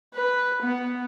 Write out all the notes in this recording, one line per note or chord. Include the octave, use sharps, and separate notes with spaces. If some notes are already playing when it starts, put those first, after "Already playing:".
B4
B3